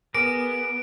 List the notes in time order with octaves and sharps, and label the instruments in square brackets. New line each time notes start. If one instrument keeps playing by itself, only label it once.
[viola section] B3 [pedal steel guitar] G#4 A#4 D6 [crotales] D7